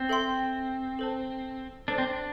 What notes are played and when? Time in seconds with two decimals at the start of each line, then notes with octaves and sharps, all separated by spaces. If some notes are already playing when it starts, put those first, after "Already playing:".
Already playing: C4
0.09 A4 E5 G5 C6
0.99 A4 C5 A5
1.88 D4 A4 C5 A5
1.98 C4
2.07 D4